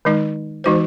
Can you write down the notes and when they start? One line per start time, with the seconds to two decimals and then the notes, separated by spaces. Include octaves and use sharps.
0.05 D#3 G#3 D#4
0.64 E3 G#3 D#4 F#4 C5